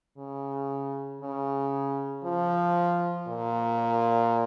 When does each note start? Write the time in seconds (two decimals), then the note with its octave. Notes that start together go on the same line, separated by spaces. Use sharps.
0.17 C#3
1.21 C#3
2.24 F3
3.28 A#2